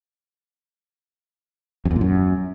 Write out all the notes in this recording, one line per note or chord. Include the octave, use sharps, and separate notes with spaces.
F2
E2
A#2
F#2